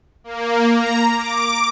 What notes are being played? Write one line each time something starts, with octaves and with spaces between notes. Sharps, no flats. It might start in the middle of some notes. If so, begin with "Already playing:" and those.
A#3
A#5
D6